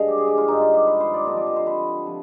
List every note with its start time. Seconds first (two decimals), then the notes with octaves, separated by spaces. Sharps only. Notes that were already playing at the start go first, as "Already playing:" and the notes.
Already playing: G2 D3 G#3 D#5 F5
0.08 G4
0.18 G#4
0.28 G4
0.38 F4
0.47 G2 D#3 G#3 D#4
0.61 F4
0.74 G4
0.87 B4
1.00 C5
1.14 D5
1.27 D3 F3 C4 D#5
1.37 D5
1.47 D#5
1.56 C5
1.67 B4
2.06 C3 F3 C4